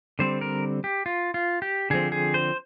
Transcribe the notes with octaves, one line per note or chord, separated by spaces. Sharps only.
D3 G3 C4 C5
A#4
G4
F4
F4
G4
D3 F3 C4 G#4
G#4
C5